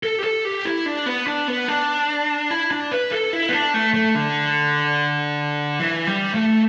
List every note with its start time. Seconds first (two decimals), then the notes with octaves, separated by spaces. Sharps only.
0.03 A4
0.18 G4
0.24 A4
0.45 G4
0.65 E4
0.86 D4
1.06 B3
1.27 D4
1.48 B3
1.68 D4
2.51 E4
2.71 D4
2.92 B4
3.12 A4
3.33 E4
3.49 B3
3.53 D4
3.74 A3
3.94 A3
4.15 D3
5.80 E3
6.07 G3
6.35 A3